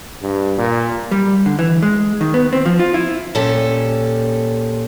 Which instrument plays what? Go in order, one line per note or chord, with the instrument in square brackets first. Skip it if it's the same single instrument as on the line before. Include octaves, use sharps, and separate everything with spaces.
[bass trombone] G2
A#2
[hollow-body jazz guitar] G3
D3
E3
G#3
D#3
B3
C4
F3
F4
E4
[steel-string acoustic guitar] A#2 C#4 G4 A4